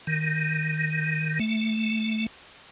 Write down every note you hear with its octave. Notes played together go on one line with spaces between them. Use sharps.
D#3
A3